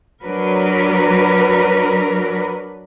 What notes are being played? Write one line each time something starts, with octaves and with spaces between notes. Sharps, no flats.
F#3 D4 A#4 B4